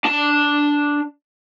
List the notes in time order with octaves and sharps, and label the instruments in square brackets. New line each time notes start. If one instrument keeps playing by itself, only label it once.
[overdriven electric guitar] D4 A5